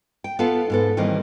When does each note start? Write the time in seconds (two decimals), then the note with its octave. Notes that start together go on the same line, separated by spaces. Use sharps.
0.24 G5
0.39 B3 F4 A4 B4 F5 A5
0.70 G#2 B3 A4
0.97 D#3 E3 G3 A#3 C4